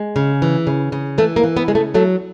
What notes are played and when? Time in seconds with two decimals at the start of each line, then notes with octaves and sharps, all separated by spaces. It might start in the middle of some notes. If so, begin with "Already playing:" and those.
Already playing: G#3
0.16 C#3
0.42 E3
0.67 C#3
0.92 C#3
1.18 E3 A3
1.36 A#3
1.43 E3
1.57 B3
1.68 C#3 G#3
1.75 A3
1.94 F#3 A3